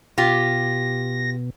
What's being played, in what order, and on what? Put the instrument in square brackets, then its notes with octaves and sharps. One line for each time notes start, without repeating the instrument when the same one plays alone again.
[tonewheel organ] B2 [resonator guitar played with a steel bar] F4 G4 [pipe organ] A#6